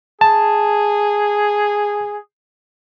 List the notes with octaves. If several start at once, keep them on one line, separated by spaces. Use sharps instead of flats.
G#4 A5